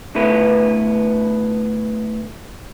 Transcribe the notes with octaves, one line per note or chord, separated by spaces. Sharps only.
D3 A3 B3 E4 B4